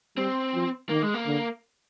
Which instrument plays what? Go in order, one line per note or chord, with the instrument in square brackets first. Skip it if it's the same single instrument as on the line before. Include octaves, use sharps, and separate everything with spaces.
[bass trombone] G3 [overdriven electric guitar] C4
[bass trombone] F3
[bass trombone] D#3 [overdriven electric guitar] A#3
[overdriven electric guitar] G#3
A#3
[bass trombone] D3